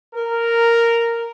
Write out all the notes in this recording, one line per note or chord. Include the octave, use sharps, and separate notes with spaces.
A#4